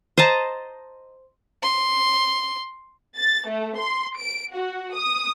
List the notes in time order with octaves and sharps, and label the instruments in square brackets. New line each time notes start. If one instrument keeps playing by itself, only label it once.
[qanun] C5 D#5 A5 A#5
[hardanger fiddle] C6
[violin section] A6
A3
C6
D7
F#4
D#6